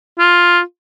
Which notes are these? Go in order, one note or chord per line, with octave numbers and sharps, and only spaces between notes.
F4